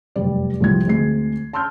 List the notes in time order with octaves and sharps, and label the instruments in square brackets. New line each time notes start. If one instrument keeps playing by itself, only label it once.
[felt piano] F1 F#2 G3 G4 D5
C2 G#2 F3 G3 E4 G#6
D2 G#3 C4 C7
A5 C6 E6 F6 G6